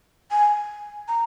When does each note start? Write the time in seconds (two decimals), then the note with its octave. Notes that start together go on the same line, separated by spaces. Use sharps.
0.31 G#5
1.08 A#5